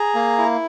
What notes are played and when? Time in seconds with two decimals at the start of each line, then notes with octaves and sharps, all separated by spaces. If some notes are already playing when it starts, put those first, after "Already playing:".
Already playing: G#4 A#5
0.15 A#3
0.38 E4